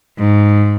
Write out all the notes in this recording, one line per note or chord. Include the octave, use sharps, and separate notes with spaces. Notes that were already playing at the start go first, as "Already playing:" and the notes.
G#2